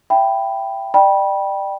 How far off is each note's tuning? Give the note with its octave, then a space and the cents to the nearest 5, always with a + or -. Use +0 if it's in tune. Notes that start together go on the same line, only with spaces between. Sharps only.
E5 +25 G5 +0 B5 +0
D5 +35 G5 +0 B5 -25